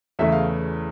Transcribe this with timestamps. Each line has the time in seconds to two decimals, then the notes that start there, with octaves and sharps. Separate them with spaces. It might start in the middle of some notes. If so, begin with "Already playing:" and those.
0.19 E2 C#3 E3 A3 E5
0.32 F5